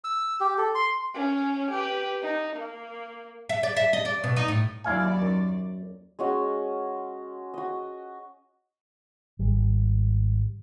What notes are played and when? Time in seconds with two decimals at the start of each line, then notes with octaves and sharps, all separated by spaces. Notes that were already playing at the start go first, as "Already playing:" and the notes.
0.04 E6
0.40 G4
0.58 A4
0.75 C6
1.14 C#4
1.71 G4 B4
2.21 D#4
2.56 A#3
3.49 E5
3.63 D5
3.77 E5
3.93 D#5
4.05 D5
4.24 B2
4.36 D#4
4.48 A2
4.84 D#2 F#3 E4 D5 F5 G#5
5.22 F#2
6.19 G#3 C#4 F#4
7.54 F#4 D#5
9.39 G#1 G3